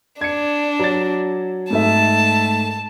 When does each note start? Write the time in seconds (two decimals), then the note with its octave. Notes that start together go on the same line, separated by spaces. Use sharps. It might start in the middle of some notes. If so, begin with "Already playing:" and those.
0.21 D4 G#6 C#7
0.79 F#3 A6
1.71 G#2 A3 E5 A5